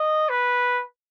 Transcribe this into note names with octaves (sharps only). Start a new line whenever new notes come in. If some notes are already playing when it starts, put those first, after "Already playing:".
Already playing: D#5
B4